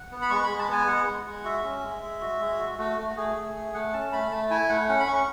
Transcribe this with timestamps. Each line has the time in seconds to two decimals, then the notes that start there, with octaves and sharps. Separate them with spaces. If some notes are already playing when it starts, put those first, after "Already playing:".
Already playing: F#5
0.11 B3
0.22 B5
0.30 G#3 C#6
0.44 B5
0.49 G#3
0.59 A5
0.69 B3 G#5
0.87 G#3 F#5
1.06 G#3
1.26 G#3
1.45 F#4 E5
1.64 C#4
1.83 G#3
2.02 G#3
2.21 F#4
2.40 G#3
2.59 F#4
2.78 A3 F#4
2.97 A3
3.09 F#4
3.16 A3 G#4
3.36 A3
3.55 A3
3.74 A3 F#5
3.93 C#4 A5
4.12 A3 B5
4.31 A3 A5
4.50 E4 G#5
4.69 A3 F#5
4.88 C#4 F#5
4.99 B5
5.07 C#4 C#6